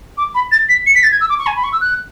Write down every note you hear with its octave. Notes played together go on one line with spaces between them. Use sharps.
D6
B5
A6
B6
C#7
B6
A6
G#6
E6
D6
C#6
G#5
B5
C#6
E6
F#6